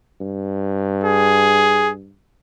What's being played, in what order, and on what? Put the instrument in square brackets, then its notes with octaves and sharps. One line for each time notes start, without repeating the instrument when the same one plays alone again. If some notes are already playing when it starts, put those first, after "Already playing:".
[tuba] G2
[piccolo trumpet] G#4